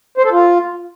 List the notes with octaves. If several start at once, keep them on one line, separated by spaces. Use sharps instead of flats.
C5
A4
F4